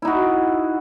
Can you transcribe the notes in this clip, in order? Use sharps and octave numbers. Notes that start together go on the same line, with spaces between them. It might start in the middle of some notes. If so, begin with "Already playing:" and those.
D#4 E4 F#4